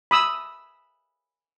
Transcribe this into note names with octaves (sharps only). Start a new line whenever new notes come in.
B5 D#6 E6